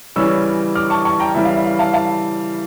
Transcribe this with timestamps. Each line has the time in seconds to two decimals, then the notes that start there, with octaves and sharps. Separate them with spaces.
0.16 C#3 E3 G3 C#4 C#6 E6
0.75 D6 F6
0.90 A5 C#6
1.05 A5 C#6
1.20 G5 A#5
1.35 C#3 E3 G3 E5
1.45 F5
1.54 E5
1.64 F5
1.79 F5 A5
1.94 F5 A5